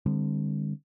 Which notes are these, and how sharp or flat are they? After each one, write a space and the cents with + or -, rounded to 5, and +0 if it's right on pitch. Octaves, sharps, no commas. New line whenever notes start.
D3 +20 G3 +40 C4 +0